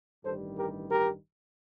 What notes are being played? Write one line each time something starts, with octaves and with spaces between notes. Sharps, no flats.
A1 G2 D#3 G3 A4 C5
G4 A#4
G4 A#4